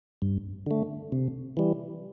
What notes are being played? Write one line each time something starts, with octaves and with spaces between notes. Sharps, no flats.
G2
D3 A3
C3
E3 G3